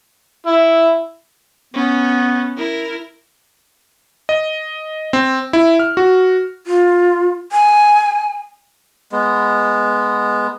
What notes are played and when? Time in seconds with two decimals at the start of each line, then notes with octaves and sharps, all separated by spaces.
0.46 E4
1.74 B3 C#4
2.57 E4 A#4
4.29 D#5
5.13 C4
5.53 E4
5.79 F6
5.97 F#4
6.67 F4
7.52 G#5
9.12 G#3 B3